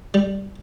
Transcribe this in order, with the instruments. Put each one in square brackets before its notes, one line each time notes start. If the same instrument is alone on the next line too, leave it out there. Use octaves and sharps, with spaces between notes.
[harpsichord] G3